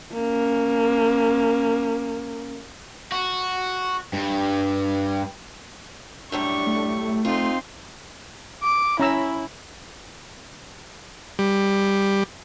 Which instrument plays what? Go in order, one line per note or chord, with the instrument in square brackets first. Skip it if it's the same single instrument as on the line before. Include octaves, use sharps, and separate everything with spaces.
[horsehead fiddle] A#3 C#4
[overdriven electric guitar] F#4
G2
[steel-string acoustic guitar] F#2 A2 G3 [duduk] D4 [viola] C#6
[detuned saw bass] A3
[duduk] C4 [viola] D#4 C6 [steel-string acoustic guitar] F4
[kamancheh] D6
[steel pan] C#4 A#5 E6 [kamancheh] E4
[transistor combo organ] G3